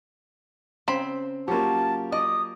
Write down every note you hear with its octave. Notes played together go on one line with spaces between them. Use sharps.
C#3 C4 B5
F#3 A#3 C#4 F4 G4 A5
D5 D#5 D#6